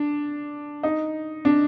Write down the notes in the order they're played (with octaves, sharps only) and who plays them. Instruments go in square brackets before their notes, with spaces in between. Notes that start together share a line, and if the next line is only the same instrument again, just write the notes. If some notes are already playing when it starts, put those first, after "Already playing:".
Already playing: [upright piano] D4
D#4
D4